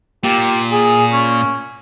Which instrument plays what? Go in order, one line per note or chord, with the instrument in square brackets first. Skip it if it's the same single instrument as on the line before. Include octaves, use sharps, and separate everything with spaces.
[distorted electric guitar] A#2 [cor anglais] G4
[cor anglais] G#4
C#4